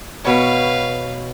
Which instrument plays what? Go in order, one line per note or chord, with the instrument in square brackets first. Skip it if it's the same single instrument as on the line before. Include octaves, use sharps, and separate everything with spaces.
[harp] B2 C#5 [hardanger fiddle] B4 F5